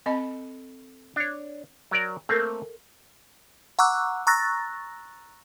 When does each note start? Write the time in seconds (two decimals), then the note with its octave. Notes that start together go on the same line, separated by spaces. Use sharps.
0.06 C4 A4 D#5 B5
1.16 D4 C#5
1.91 F#3 A#4 D5
2.29 A3 A#3 C4 A4 A#4
3.79 F#5 A#5 C#6 D6 E6 F#6
4.27 A#5 C#6 E6 F#6 A6 A#6